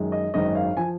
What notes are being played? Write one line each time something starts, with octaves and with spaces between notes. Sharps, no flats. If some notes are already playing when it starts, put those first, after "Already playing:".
Already playing: F#2 D#3 G#3
D#5
G#1 F#2 D#3 G#3 D#5
F5
F3 G#5